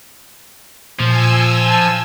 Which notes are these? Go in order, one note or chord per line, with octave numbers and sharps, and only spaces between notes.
A#2 F3 G#5 E6
A5